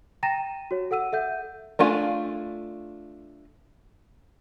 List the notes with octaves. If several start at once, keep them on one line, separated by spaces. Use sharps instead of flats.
G5 A#5 A6 A#6 D#7 E7
F#4 C#5
A4 F#5 E6 D#7
A4 E5 F#5 G6
A3 D4 F4 G#5